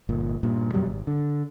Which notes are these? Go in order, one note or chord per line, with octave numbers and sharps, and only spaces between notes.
G1 A#2
G2 A#2
F#2 B2 F#3 G3
G#1
D3